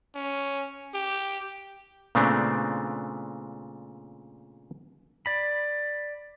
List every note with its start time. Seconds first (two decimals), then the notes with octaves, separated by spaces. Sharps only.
0.15 C#4
0.94 G4
2.15 A#2 C#3 A3 B3 C4 D4
5.26 D5 B5